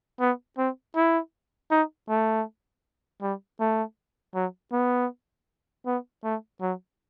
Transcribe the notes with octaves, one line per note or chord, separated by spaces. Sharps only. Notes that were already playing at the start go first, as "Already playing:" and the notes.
B3
C4
E4
D#4
A3
G3
A3
F#3
B3
B3
A3
F#3